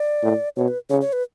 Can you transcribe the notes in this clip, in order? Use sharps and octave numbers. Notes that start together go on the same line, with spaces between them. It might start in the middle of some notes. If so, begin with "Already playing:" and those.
Already playing: D5
A2
B2 C#5
B4
C#3 C#5
C#5
B4